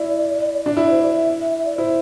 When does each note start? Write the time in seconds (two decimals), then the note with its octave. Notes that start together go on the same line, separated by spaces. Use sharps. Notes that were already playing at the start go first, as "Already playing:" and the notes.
Already playing: E4 D5
0.66 D4
0.76 E4 D5
0.90 C5
1.03 D5
1.15 E5
1.41 E5
1.53 E5
1.65 D5
1.78 E4 C5